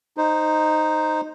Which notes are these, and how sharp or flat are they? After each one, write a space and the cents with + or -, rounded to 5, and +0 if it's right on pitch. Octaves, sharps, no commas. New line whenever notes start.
D#4 -5 C5 +0